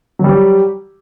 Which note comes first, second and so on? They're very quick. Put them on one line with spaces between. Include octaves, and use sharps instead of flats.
F#3 G3 G4